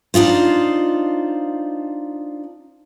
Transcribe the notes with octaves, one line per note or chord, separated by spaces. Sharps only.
D4 D#4 F4 C5